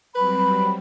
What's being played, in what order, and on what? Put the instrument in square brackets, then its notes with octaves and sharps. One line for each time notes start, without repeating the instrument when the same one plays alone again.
[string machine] F#3 G3 C4 [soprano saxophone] B4 [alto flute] B5